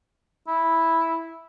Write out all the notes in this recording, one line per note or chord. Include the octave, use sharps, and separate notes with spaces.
E4